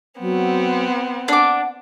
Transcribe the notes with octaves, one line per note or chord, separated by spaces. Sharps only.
F#3 B3 C4
D4 F#5 D6